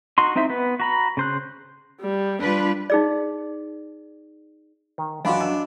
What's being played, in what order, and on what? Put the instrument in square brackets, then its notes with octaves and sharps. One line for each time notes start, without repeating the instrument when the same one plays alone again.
[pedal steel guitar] D#4 F#4 C6
C4 D#4 E4 C5 E5
B3 B4
F#4 A#5 B5
C#3 C5 F#6
[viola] G3
[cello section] G3 B4 [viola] D4 F4
[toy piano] D#4 G#4 D5
[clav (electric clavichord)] D#3
[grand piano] F#2 F#4 [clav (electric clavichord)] E3 [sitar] D4 [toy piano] D#5 F5 C6
[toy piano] D#5 A#5 E6